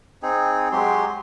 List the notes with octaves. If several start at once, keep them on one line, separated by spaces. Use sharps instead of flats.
C4 D#4 G#4
F#3 G#3 G4 C6